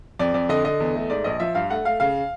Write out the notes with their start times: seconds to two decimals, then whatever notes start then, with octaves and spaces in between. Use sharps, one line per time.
0.19 F2 D5
0.34 F2 D5
0.49 D3 D#5
0.65 D3 D#5
0.80 E2
0.95 A3
1.10 G#2 D5
1.24 A#1 D#5
1.40 F3 E5
1.55 G2 F5
1.70 A3 F#5
1.85 A3 F5
2.00 C#3 F5